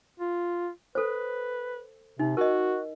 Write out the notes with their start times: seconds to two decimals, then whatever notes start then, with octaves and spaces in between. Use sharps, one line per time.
0.20 F4
0.95 A4 B4 C5
2.19 C3 D#4
2.37 F#4 A#4 D#5